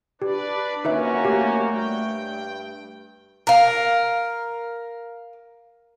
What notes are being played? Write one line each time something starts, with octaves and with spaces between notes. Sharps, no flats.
D4 G4 B4 D5
B1 F2 A#3 C#4 D#4 F#4 B4 E5
A3 G4
G2 G5
A#4 F5